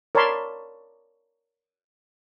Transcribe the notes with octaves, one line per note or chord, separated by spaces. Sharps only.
A#4 C#5 D5 A5 B5 C6